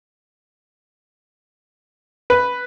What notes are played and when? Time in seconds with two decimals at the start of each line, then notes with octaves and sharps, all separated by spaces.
2.30 B4